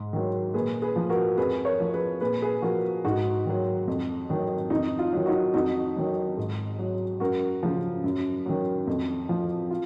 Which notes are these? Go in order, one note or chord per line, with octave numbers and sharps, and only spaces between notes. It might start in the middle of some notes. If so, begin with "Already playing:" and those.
Already playing: G#2
D#3 F#3
A#2 G#4 B4
G#4 B4
F3
F#4 A#4
F2 G#4 B4
A#4 C#5
F3
G#4 B4
A#2 G#4 B4
G#4 B4
F3 F#4 A#4
G#2 D#4 F#4
D#3 F#3
F2
D#3 F#3
F2 D#4
F4
D#3 F#3
D#4 F#4
F2 D#4 F#4
D#3 F#3
G#2
F#3
F#2 F#4 A#4
C#3 F3
F#2
D#3 F#3
F2
F3
F4